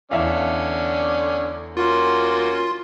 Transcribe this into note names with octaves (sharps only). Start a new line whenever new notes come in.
E2 D3 C#4 D5 E5 F5
A#3 C#4 F4 F#4 C6